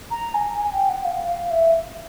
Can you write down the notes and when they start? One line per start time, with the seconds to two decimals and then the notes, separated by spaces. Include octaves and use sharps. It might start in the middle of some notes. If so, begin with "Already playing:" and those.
0.11 A#5
0.34 G#5
0.58 G#5
0.73 G5
0.89 F#5
1.05 F5
1.27 F5
1.51 E5